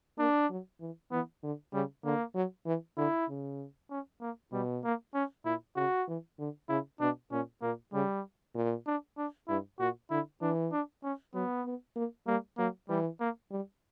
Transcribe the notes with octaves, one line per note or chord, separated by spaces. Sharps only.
A#3 D4
F#3
E3
E3 B3
D3
C#3 G3
D3 A#3
F#3
E3
D3 E4
C#3
C#4
A#3
B2 G3
A#3
C#4
A#2 E4
C#3 F#4
E3
D3
C#3 E4
B2 D4
A#2 C#4
A#2 A#3
C#3 G3
A#2
D4
D4
G2 E4
A#2 F#4
D3 E4
E3 D4
D4
C#4
F#3 B3
B3
A#3
G3 A#3
F#3 A#3
E3 G3
A#3
G3